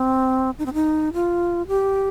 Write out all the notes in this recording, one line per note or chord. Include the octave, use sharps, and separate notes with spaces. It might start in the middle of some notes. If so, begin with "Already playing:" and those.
Already playing: C4
D#4
C4
D#4
F4
G4